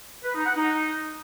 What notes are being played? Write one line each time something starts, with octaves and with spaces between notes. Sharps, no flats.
B4
D#4
F#5
D#4